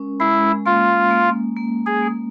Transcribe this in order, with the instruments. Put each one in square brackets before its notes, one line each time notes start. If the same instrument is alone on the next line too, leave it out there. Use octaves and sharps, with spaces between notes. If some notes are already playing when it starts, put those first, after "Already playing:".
Already playing: [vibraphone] G#3 C#4 A#4
[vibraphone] G#3 [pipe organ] E4
[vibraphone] A#3 [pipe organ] F4
[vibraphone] A#3
A#3
[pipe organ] G#4
[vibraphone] A#3